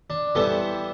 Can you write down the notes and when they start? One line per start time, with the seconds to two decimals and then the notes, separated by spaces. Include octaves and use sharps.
0.10 D4
0.35 E3 G3 B3 A4 C5